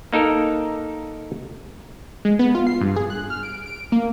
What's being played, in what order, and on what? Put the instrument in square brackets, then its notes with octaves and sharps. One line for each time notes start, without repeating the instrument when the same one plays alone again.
[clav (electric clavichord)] A#3 D#4 A4 A#4
[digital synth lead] G#3
B3
F4
C7
G2
G#4
F#6
F6
D7
D7
A#3